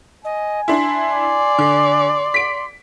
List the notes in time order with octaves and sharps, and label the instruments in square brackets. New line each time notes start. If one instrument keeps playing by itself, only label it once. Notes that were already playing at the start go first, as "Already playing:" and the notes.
[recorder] D#5 [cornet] G#5
[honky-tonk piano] D4 E4 [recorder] C6
[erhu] D5
[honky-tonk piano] D3
B6 D7